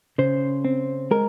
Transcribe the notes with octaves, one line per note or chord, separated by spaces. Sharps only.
C#3 C5
C4
G#3 A#4